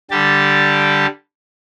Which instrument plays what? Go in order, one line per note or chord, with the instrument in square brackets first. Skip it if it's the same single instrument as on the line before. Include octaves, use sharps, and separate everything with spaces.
[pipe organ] D3 G3 G4 A5